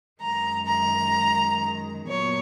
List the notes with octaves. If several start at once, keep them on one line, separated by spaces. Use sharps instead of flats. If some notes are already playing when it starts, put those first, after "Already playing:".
F#2 D#3 G#3 A#5
A#5
A#2 F#3 B3 C#5